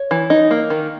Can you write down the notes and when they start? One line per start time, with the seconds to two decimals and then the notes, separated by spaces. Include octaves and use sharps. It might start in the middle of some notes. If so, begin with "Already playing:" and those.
Already playing: C#5
0.11 E3
0.30 D#4
0.51 A#3
0.70 D#3